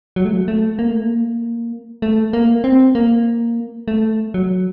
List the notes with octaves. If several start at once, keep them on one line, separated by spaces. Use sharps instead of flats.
F#3
A3
F#3
A3
A#3
A3
A#3
A3
A#3
C4
A#3
A3
F#3